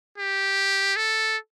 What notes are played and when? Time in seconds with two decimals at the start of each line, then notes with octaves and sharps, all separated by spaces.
0.18 G4
0.96 A4